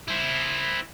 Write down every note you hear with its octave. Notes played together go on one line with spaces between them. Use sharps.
E4 C5